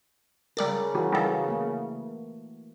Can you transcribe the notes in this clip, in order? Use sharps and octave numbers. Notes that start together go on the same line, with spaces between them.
C#3 G3 A#4 D5 A6
E3 G3 F#4 A#4
G3 D#4 F#4 A4
A3 A#3